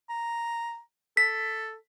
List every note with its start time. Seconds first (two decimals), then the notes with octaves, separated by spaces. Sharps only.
0.10 A#5
1.17 A4 B6